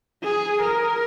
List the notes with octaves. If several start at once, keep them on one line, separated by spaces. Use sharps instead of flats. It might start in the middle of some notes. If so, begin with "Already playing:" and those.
G#4
A#4